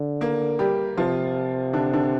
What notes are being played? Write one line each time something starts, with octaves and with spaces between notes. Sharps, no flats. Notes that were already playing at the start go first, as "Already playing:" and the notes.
Already playing: D3
A#3 A#4
G3 G4
C3 F3 F4
D3 D4
D3 D4